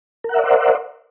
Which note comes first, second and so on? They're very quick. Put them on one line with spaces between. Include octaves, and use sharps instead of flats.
A#4 F#5 E5 D5 C5